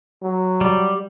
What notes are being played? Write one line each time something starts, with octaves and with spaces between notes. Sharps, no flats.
F#3
G3